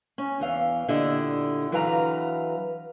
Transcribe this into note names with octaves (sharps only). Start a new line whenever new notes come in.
C#4
E2 E3 F5
A#2 D3 E4 G4 D#5
E3 F#3 B4 F5 G#5 A#5